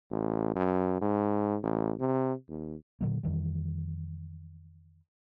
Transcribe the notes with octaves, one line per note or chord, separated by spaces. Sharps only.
A1
F#2
G#2
A1
C3
D#2
A#2 D3 F#3 A#3
F2 D#3 E3 G3